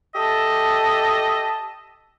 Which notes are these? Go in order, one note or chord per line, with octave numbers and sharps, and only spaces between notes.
G4 A4 D#5 E5 A5